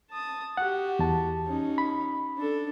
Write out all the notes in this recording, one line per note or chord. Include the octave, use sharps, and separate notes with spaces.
A5 D#6
F#4 G4 F#5
E2 A5
C#4 D#4
B5
D4 A4